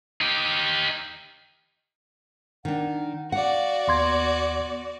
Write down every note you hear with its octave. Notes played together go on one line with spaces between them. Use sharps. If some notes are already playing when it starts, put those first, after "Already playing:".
D#4 G4
D#3 D4 F#5
F#4 D5 F5 F#5
D#2 B3 C6 G#6